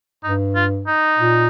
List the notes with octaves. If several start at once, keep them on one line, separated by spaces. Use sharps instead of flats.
G2 D#4
F4
D#4
A#2